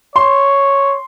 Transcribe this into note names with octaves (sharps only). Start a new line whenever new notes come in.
C#5 C6